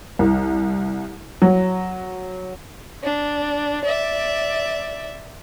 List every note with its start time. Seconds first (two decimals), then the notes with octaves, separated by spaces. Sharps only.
0.19 C2
1.42 F#3
3.04 D4
3.85 D5 E5